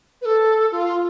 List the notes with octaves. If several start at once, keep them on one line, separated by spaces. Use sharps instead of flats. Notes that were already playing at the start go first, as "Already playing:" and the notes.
B4
A4
F4